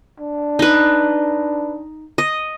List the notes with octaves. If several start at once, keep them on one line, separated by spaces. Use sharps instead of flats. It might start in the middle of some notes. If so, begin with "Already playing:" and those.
D4
D#4 B4
D#5